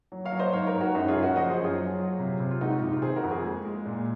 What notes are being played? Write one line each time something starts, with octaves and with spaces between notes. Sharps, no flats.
F#3
C#5 F5
F#3
C5 D#5
G#2 C#5 F5
A#4 C#5
G#2
F#4 A#4
F#2 D#4 F#4
F4 G#4
C#3
F#4 A#4
F3 D#5 F#5
G#4 C5
F#2
F4 G#4
F#3
F#3
C3
C3
F4
G#3 D#4 F#4
F4
C3 D#4
F4
D#3 G#4 C5
F#4 A#4
F2
F4 G#4
G#3
G#3
A#2